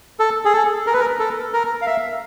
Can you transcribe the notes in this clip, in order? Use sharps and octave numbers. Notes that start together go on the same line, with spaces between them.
A4
G#4
A4
A#4
B4
A#4
A4
A#4
F5
E5